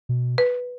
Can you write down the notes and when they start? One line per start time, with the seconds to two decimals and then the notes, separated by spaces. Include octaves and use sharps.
0.09 B2
0.38 B4